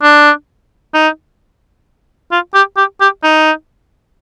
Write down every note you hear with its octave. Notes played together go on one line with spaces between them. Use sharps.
D4
D#4
F4
G4
G4
G4
D#4